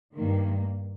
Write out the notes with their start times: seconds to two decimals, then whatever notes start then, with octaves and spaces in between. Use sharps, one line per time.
0.14 G2 D#3 A#3